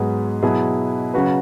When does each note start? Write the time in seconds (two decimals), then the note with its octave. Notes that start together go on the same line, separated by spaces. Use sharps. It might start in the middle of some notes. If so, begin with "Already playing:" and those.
Already playing: G#2 F#3 B3 G#4
0.43 B2 F#3 E4 G#4
1.13 C#3 F#3 C#4 F#4 B4